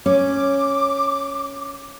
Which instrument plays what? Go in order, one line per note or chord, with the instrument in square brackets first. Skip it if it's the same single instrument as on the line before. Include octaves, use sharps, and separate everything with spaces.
[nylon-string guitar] C#4 [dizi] D6